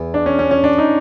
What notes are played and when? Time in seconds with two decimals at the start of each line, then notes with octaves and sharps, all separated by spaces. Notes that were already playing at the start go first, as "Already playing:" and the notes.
Already playing: E2
0.14 D4
0.26 C#4
0.39 C#4
0.51 C#4
0.64 D4
0.78 D#4